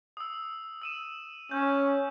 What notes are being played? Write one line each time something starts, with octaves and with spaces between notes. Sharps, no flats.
D#6 E6
E6 D#7 E7
C#4 G6